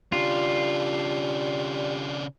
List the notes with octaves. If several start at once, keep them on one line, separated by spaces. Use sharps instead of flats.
C#3 G3 D4 F4